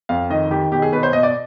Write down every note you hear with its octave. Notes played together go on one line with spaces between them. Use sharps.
F2 F5
D#3 D#5
D#3 G4
B2 G4
G#4
B2 B4
C5
B2 D#5
D5